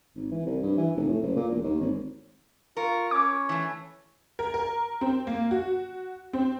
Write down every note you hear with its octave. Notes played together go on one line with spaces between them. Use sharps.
G#1
E3
C2
G2
E3
F1
A2
F#1
A#2
E1
D#2
G#1
F4 A#4 C#6
C#4 C#5 D6
E3 A3
A#4
A#4
C4
A#3
F#4
C4